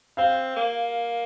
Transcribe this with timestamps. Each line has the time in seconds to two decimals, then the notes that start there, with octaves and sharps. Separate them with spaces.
0.17 C4 F5
0.56 A#3